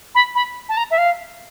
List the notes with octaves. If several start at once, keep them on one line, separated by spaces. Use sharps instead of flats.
B5
B5
A5
A#5
E5
F5